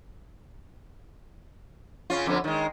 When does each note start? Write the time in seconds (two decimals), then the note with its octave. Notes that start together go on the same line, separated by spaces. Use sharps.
2.10 C#3 C#4 F4
2.26 F2 D3 B3
2.44 D#3 G#3